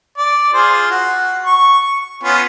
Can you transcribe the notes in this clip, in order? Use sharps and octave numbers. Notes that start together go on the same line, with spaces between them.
D5
F4 G#4 C5
F#4
C#6
B3 C#4 F4